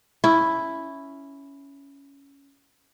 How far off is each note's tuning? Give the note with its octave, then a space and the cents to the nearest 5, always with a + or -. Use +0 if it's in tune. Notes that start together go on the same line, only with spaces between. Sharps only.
C#4 +10 E4 +0